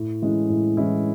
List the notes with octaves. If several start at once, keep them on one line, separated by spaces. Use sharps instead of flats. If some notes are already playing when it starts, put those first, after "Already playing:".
Already playing: A2
E3 G#3 C#4 E4
A2
E3 G#3 C#4 E4